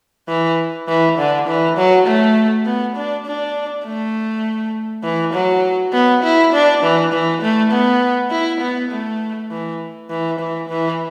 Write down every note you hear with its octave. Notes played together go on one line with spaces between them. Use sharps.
E3
E3
D3
E3
F#3
A3
B3
D4
D4
A3
E3
F#3
B3
E4
D4
E3
E3
A3
B3
E4
B3
A3
E3
E3
E3
E3